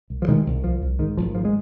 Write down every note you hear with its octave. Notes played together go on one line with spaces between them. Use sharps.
C2
F3
C3 D#3 G#3
C2
C2 F3
C2
G#2 D#3
G#1 F3
G#2 F3
G#3